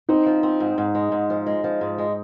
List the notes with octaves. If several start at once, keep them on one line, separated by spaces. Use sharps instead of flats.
C4 D#4
F3
C4
G#2
G#2
G#3
G#2
F3
G#3
F3
G#2
G#3